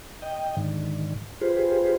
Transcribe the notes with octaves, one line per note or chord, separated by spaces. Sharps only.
D#5 G5
G#2 D3 D#3
F4 G4 G#4 B4 C5